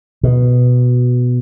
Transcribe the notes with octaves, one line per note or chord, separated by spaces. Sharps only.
B2